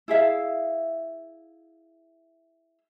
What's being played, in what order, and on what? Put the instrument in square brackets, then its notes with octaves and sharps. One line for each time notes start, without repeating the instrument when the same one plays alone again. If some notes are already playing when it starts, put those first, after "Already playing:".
[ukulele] E4 G#4 E5 F5